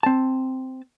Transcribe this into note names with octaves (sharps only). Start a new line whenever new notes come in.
C4 A5